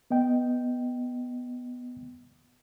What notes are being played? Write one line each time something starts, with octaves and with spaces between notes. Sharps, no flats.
B3 D#5 G5